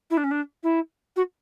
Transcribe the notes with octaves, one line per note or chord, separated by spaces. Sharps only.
E4
D4
C#4
D4
E4
F#4